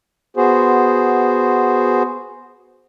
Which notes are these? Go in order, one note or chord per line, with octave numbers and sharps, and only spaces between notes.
B3 F#4 G#4 C5